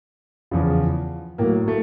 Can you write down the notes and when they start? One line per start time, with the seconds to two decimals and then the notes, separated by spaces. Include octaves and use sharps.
0.51 E2 C#3 F3
1.38 A2 F#3 A#3
1.68 A3